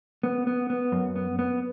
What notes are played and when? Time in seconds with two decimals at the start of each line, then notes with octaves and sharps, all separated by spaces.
0.23 B3
0.47 B3
0.70 B3
0.92 F#2
1.16 B3
1.39 B3